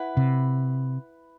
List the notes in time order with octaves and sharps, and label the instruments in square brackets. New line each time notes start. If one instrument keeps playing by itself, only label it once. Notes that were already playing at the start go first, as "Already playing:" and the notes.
Already playing: [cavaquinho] E4 B4 F#5
[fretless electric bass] C3